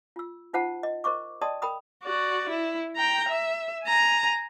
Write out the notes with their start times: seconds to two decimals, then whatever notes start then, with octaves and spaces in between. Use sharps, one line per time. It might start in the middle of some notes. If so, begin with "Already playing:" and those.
0.16 F4 E6
0.53 D#4 F4 C5 F#5 A5
0.83 D#5
1.04 A#4 C5 D#5 C#6 D6
1.42 D5 D#5 G5 A5 C6 D#6
1.62 A#4 G5 B5 D#6
2.04 F#4 D5
2.49 E4
2.96 G5 A#5
3.28 E5
3.84 G#5 A#5